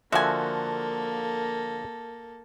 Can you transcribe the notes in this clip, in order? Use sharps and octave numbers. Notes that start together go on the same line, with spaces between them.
D3 F3 A#3 F#4 A4 E5 G#5